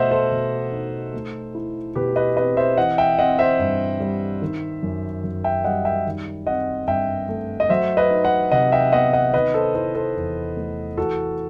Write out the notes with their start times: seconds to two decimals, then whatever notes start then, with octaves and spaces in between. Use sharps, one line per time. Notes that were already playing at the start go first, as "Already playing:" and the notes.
Already playing: B2 A3 C5 D#5 E5 F#5
0.11 A4 C5
0.31 B2
0.72 D#4
1.14 A3
1.55 E4
1.95 B2 G4 B4
2.16 B4 D#5
2.37 C4 B4 D#5
2.57 C5 E5
2.77 E3 D#5 F#5
2.98 E5 G5
3.18 C4 D#5 F#5
3.39 C5 E5
3.59 G2
4.00 G3
4.42 D#3
4.83 F#2
5.24 F#2
5.44 E5 G5
5.64 G3 D#5 F#5
5.85 E5 G5
6.06 D#3
6.47 C4 D#5 F#5
6.87 G2 E5 G5
7.29 A3
7.60 D#5
7.69 F#3 C5 E5
7.97 B4 D#5
8.11 D#4
8.25 D#5 F#5
8.51 C3 D#5 F#5
8.72 E5 G5
8.92 B3 D#5 F#5
9.13 D#5 F#5
9.33 D#3 B4 D#5
9.54 A4 C5
9.75 E4 A4 C5
9.95 A4 C5
10.16 E2
10.57 A3
10.97 E3 F#4 A4